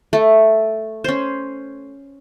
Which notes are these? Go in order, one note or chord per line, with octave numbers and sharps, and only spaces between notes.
A3
C#4 C5